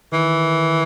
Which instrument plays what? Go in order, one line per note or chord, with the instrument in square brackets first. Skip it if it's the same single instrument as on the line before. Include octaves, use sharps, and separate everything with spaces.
[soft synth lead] D#3 [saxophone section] E3